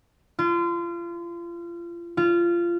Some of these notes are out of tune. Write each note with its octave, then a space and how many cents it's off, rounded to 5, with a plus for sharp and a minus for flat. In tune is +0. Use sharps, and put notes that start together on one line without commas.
F4 -30
F4 -20